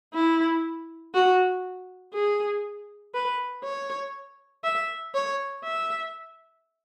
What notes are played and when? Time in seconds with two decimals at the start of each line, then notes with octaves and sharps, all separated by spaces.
0.14 E4
1.14 F#4
2.14 G#4
3.14 B4
3.64 C#5
4.64 E5
5.14 C#5
5.65 E5